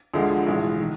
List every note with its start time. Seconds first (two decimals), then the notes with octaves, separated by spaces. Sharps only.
0.14 D2 D3 F3 G#3
0.47 B1 A2 E3 G#3
0.81 D#3